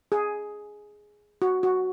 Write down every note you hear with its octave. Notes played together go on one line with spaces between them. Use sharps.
G#4
F#4
F#4